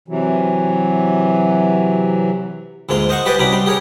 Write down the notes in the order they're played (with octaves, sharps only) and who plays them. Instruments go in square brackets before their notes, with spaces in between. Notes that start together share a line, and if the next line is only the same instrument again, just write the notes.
[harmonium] C3 E3 F#3
[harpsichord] D2 G#2 A#3 F4 C6
C5 D#5 F5 F#5 C#6
G4 B4 C5 D5 D#5 G#5
C2 C#4 D#4 F#4 B5 D6
G3 C6
G4 G#4 A#4 C#5